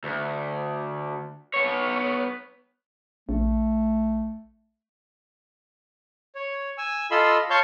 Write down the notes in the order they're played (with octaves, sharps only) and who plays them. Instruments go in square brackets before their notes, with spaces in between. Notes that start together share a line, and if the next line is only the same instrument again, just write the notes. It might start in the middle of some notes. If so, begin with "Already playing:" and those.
[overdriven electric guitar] D2
B3 C#5
[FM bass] A#1 [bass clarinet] A3
[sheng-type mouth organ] C#5
G#5 E6
F4 A4 D#5 B5 C6 E6
C#5 F5 A5 C6 C#6 G6